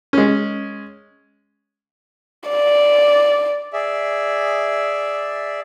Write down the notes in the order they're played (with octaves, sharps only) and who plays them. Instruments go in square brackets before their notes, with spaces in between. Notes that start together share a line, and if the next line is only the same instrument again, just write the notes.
[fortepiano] G#3 C#4
[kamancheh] D5
[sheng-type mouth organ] G#4 D5 E5